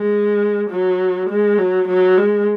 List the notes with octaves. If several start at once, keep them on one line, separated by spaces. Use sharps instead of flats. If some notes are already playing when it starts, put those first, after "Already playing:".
Already playing: G#3
F#3
G#3
F#3
F#3
G#3